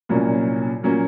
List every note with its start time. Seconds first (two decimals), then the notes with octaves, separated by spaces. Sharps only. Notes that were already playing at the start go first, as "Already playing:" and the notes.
0.09 C2 A#2 F#3 A#3 C#4
0.83 A#2 F#3 A#3 C#4